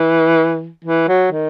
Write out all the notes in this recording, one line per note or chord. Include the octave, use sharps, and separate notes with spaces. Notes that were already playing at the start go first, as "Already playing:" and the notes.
Already playing: E3
E3
F#3
D#3